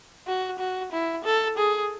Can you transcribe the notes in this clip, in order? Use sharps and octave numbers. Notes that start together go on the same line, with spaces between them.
F#4
F#4
E4
A4
G#4